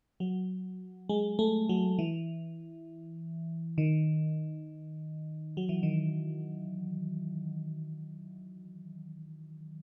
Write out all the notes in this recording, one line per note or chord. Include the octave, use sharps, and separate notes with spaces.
F#3
G#3
A3
F#3
E3
D#3
F#3
E3
D#3